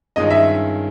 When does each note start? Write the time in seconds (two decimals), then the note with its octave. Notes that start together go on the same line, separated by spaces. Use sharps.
0.16 G2 D#3 G#3 C#4 F4 D#5
0.30 E5